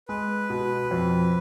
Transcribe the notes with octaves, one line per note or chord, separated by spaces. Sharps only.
G#3 B4
B2
F2